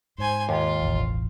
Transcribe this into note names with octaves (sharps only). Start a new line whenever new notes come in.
G#2 C5 G#5
D#2 F4
E1 A1